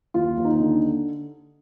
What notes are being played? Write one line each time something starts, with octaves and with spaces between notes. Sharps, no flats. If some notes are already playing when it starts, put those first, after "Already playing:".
D#2 F4
D#2
D#4
D3